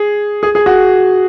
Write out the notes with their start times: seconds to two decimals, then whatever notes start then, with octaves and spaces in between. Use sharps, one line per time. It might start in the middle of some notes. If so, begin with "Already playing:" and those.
Already playing: G#4
0.43 G#4
0.55 G#4
0.66 F#4